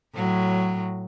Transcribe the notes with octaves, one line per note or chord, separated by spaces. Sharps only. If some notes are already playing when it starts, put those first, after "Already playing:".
A2 F#3